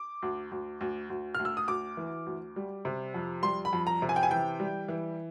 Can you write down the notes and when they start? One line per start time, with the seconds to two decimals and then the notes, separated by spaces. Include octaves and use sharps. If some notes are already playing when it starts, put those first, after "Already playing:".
Already playing: D6
0.22 D2
0.51 D2
0.81 D2
1.10 D2
1.34 D2 F6
1.45 E6
1.57 D#6
1.68 D2 D6
1.97 E3
2.26 D2
2.56 G3
2.85 C3
3.14 F2
3.43 G3 C6
3.65 B5
3.73 F2
3.87 A#5
4.02 C3
4.09 G#5
4.16 G5
4.23 G#5
4.31 E3 G5
4.60 G3
4.88 E3